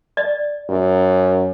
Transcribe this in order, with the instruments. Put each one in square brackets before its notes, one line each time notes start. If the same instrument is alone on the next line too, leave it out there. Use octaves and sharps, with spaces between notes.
[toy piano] D5 D#5
[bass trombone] F#2